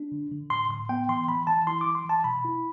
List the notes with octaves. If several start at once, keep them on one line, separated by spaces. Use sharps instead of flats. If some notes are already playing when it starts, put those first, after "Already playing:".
Already playing: D4
D3
D3
A2 C6
A2 C6
B3 G5
E3 C6
E3 B5
E3 A5
E4 C6
D6
E3
C6
E3 A5
B2 B5
E4